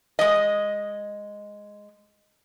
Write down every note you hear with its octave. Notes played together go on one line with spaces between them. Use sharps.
G#3 D#5